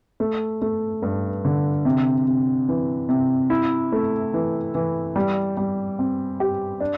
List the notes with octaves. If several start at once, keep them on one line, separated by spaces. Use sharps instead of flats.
A3
A3
G2
D3
C3
C3
E3
C3
E4
A3
E3
E3
G3
G3
C4
G4
D4